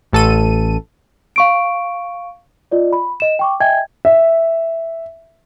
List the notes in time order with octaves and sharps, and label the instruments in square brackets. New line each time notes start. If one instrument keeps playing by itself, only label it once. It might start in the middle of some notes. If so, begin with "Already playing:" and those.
[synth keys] A1 A4 D#7
[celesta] F5 C#6 D7
F4 D5 D#5
B5
D#5 E7
G5 C#6 D6
D#5 E5 G5 G#5 G#6
[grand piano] E5